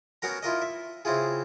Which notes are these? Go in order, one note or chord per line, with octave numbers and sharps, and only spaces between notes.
B3 C#4 F#4 A#4 A#5
E4 F4 A#4 D#5
E5
C#3 C4 E4 F4 G#4